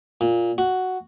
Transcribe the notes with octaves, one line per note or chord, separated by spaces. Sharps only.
A#2
F#4